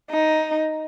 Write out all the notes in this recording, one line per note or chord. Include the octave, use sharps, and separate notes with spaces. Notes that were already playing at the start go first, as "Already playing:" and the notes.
D#4